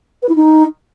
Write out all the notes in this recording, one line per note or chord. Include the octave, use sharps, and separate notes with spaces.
B4
E4
D#4